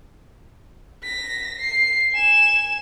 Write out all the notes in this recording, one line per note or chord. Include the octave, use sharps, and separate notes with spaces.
A#6 B6
C7
G#5 E7